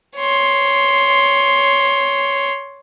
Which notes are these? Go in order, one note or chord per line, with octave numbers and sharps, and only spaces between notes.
C#5 C6